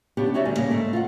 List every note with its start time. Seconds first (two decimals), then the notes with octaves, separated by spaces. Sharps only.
0.17 C#3 B3 D4 G4
0.34 D#4 F#4 C#5 D5 E5
0.45 D2 G3 G#5
0.57 C#3 A#3
0.70 G#2 A3
0.93 F4 F#5